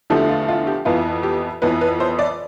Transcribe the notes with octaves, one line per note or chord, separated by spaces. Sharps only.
E2 D3 F3 A3 G4
F4
F4
G4
F2 E3 B3 F4
G4
F2 E3 B3 B4
B4
C5
D5